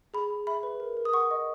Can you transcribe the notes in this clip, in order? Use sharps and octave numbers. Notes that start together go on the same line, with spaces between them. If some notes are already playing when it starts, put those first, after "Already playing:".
G#4 B5
G#4
E5 B5
B4
A#4
A#4
D#6
F#5 C#6
D#5